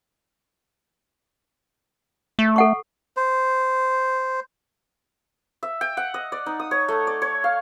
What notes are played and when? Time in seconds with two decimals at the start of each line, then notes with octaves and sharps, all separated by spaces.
2.39 A3
2.56 A4 F#5 C#6
3.17 C5
5.63 E5
5.81 G5
5.97 F#5
6.14 D#5
6.32 D5
6.46 D#4
6.60 D#6
6.71 C#5
6.88 A3
7.07 D5
7.22 C#5
7.44 F5